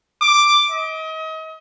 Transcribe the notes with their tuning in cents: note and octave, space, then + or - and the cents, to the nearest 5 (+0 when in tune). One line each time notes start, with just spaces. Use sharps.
D6 +5
D#5 +35